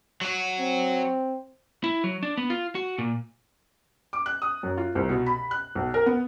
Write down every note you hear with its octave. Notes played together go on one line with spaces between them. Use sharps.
F#3 F#4
C4
E4
F#3
D4
B3
F4
F#4
A#2
D6
F#6
D#6
F#2
F4
C2
B2
B5
F#6
B1
A#4
B3